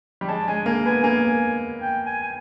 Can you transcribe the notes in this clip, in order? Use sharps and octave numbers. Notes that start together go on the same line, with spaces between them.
G3
G#3 A5
G#3 G#5
A#3 G#5
B3 G#5
A#3 G#5
G5
G#5
G#5